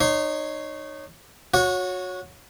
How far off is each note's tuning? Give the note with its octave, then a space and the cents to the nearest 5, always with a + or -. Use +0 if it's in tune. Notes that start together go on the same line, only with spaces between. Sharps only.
D#4 -25 C#5 -5 C6 +0
F#4 -25 C#5 +0 F#5 -25